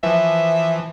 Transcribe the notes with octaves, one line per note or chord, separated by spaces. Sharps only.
E3 F3 E5